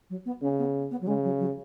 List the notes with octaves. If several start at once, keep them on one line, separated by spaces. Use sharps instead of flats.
F#3
B3
C#3 C#4
B3
B3
F#3
C#3 G#3
F#3
F#3